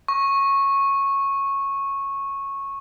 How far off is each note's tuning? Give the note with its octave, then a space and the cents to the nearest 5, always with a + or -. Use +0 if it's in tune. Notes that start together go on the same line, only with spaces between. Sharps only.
C#6 -10